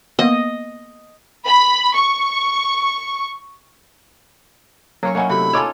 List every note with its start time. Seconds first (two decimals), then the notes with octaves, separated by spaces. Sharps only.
0.19 A#3 B3 D#5
1.46 B5
1.94 C#6
5.03 F#3 A#3 C#4 C#5
5.15 A#3 D#4 E4 C#5 F#5 G#5
5.29 C3 A3 F#4 B5
5.53 D#4 F4 A4 C#5 G#5 D6 E6